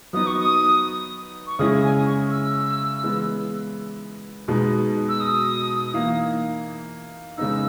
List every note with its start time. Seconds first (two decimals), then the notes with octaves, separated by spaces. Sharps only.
0.13 F#3 B3 D#4 D#6
0.27 C#6
0.39 D#6
1.47 C#6
1.59 C#3 G#3 C#4 E4 D#6
1.83 G#5
2.06 C#6
2.31 E6
3.03 E3 G#3 B3
4.48 B2 G#3 B3 D#4
5.09 E6
5.20 D#6
5.93 E3 A#3 D#4
7.38 C#3 G#3 B3 D#4 E6